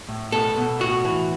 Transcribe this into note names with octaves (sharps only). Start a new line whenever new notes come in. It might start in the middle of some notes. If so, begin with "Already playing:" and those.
A2
B2 A4
B2
A2 F#4
E3